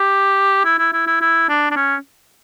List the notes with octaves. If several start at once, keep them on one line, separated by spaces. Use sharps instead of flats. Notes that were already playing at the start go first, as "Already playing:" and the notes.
Already playing: G4
E4
E4
E4
E4
E4
D4
D4
C#4